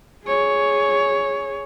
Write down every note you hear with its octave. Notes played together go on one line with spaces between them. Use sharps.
G#4 C#5